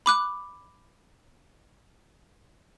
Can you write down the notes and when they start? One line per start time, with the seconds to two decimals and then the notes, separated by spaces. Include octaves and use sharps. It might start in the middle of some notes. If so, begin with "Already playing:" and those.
0.06 B5 D6 F#6